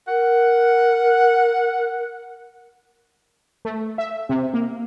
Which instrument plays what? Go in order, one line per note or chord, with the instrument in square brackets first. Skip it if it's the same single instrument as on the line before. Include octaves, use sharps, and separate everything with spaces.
[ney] A#4 [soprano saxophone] F#5
[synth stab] A3
E5
C3
A#3